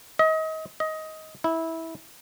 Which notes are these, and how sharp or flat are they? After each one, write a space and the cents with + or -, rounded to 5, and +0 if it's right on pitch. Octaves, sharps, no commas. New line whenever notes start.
D#5 +30
D#5 +15
E4 -15